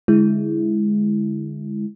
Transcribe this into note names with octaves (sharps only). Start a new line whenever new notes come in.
D3 G#3 E4